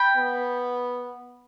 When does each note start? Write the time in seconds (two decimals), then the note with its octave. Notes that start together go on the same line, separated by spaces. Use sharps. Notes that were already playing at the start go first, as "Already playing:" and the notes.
Already playing: G5 B5
0.17 B3